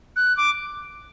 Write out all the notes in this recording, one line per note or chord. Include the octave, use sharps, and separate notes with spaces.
F#6
D6